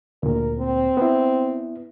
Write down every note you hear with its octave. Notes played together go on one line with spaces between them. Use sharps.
D2 A#2 A#4
C4
B3 E4